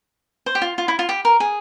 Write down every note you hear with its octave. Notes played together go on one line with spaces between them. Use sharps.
C5
G4
F4
F4
E4
F4
G4
A#4
G#4